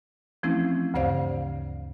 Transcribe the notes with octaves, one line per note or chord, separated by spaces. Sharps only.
E3 F3 A3 C4 C#4 E4
D2 G2 C#3 C5 D5 F5